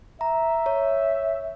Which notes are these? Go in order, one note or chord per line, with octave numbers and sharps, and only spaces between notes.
E5 A#5
C#5